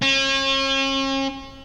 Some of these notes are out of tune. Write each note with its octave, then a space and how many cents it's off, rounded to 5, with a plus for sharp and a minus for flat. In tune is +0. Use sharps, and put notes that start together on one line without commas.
C#4 -40